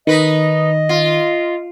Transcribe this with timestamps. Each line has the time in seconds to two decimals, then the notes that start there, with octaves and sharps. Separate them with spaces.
0.07 D#3 D#4 B4 D#5
0.89 F4